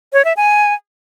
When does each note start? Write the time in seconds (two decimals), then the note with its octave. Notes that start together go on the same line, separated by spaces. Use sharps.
0.13 C#5
0.25 E5
0.37 G#5